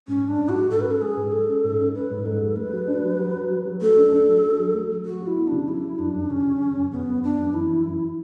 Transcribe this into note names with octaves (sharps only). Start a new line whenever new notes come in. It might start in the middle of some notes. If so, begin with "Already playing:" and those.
G#2 C#4
G#2
D4
G#2
F#4
G#3
G#2 A4
B4
C#4
A4
G#3 G#4
G#2
G#3 A4
C#4
G#2
C#4
C#4 B4
G#2
G#2 A4
G#3
A3 B4
F#3
D4
F#3
F#3
F#3
F#3
F#3
A3 A4
D4
D4
F#3
D4
F#3
A3
F#3
F#3 F#4
F#3
E4
B3
C#3 D4
F#3 E4
F#3
F#2 D4
F#2
C#3 C#4
C#3
C#3
F#2
C#3 B3
F#2
B3 D4
F#2
E3 E4
E3
F#2